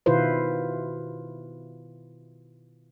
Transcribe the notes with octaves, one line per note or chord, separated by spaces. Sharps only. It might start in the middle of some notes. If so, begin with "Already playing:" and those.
B2 D#3 E4 F4 B4 C5